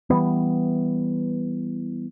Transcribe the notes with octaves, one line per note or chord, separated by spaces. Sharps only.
E3 G3 B3